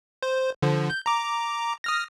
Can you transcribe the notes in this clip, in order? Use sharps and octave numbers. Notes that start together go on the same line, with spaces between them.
C5
D3 F3
G6
A#5 D6
D#6 F6 A#6